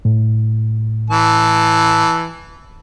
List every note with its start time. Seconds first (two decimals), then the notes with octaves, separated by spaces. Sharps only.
0.05 A2
1.10 E3 A5